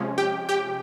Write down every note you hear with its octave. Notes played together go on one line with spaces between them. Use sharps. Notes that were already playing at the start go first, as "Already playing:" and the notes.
Already playing: C3 F3 G#3 C#4
G4 G5
G4 G5